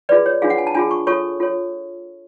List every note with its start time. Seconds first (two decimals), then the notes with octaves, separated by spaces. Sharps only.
0.09 F4 G#4 B4 D5
0.26 C#5
0.42 D4 F4 G#4 F5
0.50 F#5
0.58 G#5
0.67 A5
0.75 D4 F4 G#4 G#5
0.91 C#6
1.07 F4 A4 C#5 C#6
1.40 F4 A4 C#5